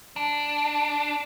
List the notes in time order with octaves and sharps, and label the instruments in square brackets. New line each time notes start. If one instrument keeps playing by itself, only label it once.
[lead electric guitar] D4